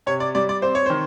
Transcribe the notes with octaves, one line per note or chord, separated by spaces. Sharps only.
C3 C#5
D5
G3 D5
D5
C4 C5
C#5
D#3 C5